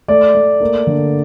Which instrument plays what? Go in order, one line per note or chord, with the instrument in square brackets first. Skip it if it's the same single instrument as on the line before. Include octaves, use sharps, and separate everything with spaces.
[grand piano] A3 D5
A3
A#3
D3